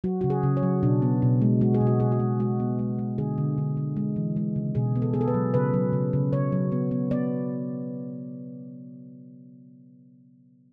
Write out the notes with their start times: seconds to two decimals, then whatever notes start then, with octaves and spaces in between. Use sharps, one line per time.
0.04 F#3 F#4
0.21 C#3 F#4
0.30 G#4
0.43 C#3
0.57 C#5
0.63 F#3
0.83 B2 D4
1.02 B3
1.22 B2
1.42 G#3
1.61 G#3 F#4
1.74 G#4
1.81 B2
1.87 F#4
2.00 B2 G#4
2.12 F#4
2.20 G#3
2.40 G#3 F#4
2.60 B3
2.79 G#3
2.99 G#3
3.18 D3 G#4
3.38 D3
3.58 D3
3.77 D3
3.97 G#3
4.16 E3
4.36 G#3
4.56 C#3
4.75 B2 G#4
4.96 B3
5.02 A4
5.14 B3 G#4
5.21 A4
5.28 B4
5.34 F#3
5.54 C#3 B4
5.74 F#3
5.93 C#3
6.13 C#3
6.32 C#3 C#5
6.52 F#3
6.72 B3
6.91 B3
7.11 B3 D5